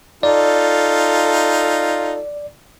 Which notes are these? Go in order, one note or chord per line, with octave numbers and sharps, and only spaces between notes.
D#4 F4 A4 D5